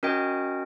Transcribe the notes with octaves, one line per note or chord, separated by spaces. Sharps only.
C#4 F#4 A#4 D#5 G5